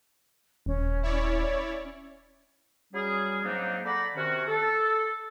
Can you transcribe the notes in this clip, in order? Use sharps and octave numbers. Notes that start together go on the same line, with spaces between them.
D#1 C#4
E4 C#5 D5
F#3 G3 C#4 G#4
G#2 F#3 A#3 C4 D4 D#4
A4 D5 F#5 A#5 B5
C3 D#3 C#4 F#4
A4